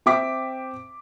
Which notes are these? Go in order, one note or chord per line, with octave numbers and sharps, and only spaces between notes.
C4 E5 G5 D6 B6